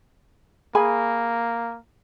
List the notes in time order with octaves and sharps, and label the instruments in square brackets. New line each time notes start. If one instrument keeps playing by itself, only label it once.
[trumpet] A#3 [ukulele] G#4 G#5 B5